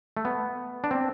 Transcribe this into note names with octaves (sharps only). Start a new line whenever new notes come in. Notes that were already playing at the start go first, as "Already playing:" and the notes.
A3
B3
D4
C4